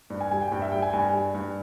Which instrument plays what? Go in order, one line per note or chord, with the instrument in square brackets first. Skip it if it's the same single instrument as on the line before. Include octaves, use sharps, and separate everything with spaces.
[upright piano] G2
G#5
G3 G#5
G5
G2 G5
E5
G3 G5
G#5
G2 G#5
G3
G2